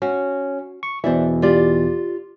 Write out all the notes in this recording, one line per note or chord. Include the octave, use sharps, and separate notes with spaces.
C#4 F#4
C#6
E2 B2 E3 C5 D5 E5
F4 G4 D5